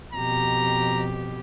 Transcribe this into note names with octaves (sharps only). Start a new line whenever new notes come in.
F2 B2 G4 A#5